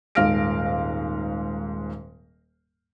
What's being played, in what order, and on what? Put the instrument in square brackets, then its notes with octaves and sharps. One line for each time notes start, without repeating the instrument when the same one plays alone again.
[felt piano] D#1 G#2 F5 F6 A#6 D7